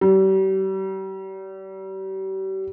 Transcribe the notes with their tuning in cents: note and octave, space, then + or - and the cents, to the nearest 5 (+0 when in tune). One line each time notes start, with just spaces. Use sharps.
G3 -40